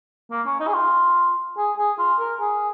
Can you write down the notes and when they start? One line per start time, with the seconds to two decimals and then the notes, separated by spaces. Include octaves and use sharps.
0.31 A#3
0.46 C#4
0.60 D#4
0.67 G#4
0.74 F4
1.57 G#4
1.77 G#4
1.99 F4
2.19 A#4
2.40 G#4